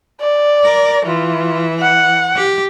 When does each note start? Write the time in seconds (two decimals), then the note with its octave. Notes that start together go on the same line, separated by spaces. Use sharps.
0.21 D5
0.64 A#4
1.05 E3 F4
1.80 F#5
2.36 G4